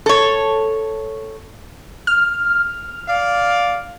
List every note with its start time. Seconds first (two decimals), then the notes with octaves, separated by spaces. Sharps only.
0.06 A4 C#5
2.07 F6
3.08 D5 F5